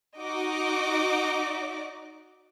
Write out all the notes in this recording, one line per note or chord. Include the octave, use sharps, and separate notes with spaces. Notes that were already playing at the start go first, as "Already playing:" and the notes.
D#4 F#4 D#5 D6